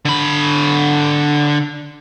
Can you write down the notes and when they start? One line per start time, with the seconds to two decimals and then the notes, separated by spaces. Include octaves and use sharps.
0.05 D3 B5